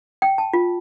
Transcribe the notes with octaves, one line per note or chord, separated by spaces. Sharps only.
G5
A5
F4